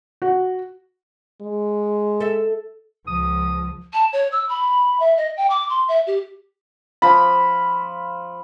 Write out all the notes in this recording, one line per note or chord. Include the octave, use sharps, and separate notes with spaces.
F#4
G#3
A4 E5
C#2 F3 D#6
A5
C#5
E6
B5
E5
D#5
G5
D6
C6
E5
G4
F3 B5